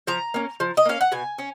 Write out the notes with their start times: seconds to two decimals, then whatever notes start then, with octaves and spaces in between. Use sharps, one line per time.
0.07 F3 A#5
0.34 A#3 C#4
0.60 F3
0.77 D#5
0.85 A#3 C#4 F5
1.01 F#5
1.12 B2 G#5
1.38 C#4